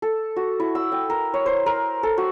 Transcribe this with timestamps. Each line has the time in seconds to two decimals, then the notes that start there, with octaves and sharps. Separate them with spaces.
0.02 A4
0.36 F#4
0.60 E4
0.75 E6
0.92 G5
1.10 A#4
1.34 C#5
1.46 C5
1.66 A#4
2.03 A4
2.18 F#4